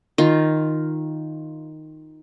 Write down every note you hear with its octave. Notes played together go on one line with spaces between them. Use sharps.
D#3 F4